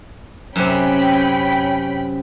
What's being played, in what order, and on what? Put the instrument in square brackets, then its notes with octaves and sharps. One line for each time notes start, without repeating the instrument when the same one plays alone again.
[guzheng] F#2 C3 [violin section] C#4 G5 B5